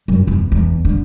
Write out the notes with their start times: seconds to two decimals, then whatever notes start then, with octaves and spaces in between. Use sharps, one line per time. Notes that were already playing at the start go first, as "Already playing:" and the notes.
0.08 F#2
0.27 E2
0.52 E2
0.85 D3